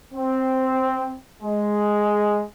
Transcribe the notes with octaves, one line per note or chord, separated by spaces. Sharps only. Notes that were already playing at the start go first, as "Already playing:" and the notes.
C4
G#3